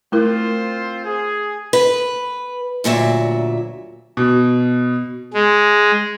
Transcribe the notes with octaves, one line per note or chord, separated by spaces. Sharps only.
A3 C4 E4 F4 A#4 C5
G#4
B4
D2 A#2 F#3 E5
B2
G#3